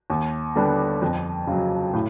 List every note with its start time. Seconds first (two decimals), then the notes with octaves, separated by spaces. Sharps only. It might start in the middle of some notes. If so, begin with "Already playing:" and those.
0.10 D#2
0.56 D3 G3 B3 D4
1.02 F2
1.47 C#3 F#3
1.93 A2